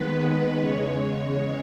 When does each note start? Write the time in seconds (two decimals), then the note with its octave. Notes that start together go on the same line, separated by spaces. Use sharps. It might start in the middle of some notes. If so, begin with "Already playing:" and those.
Already playing: D#2 D#3 G#3 B3 B4
0.58 E2 C#3 G#3 C#5